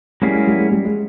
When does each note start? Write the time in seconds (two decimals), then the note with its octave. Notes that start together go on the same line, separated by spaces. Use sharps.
0.22 F#3 G3 A#3 C#4 E4 G#4
0.34 G#3
0.47 G3
0.59 G#3
0.72 G3
0.85 G#3